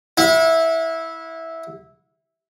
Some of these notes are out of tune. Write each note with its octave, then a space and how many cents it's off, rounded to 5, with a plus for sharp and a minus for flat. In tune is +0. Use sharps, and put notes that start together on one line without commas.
E4 -10 F#5 -45